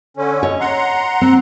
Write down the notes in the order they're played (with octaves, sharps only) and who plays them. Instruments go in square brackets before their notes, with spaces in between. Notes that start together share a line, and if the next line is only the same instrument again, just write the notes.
[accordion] D3 C#4
[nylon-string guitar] C#5 D#5
[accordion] F#5 A#5 C6
[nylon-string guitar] C4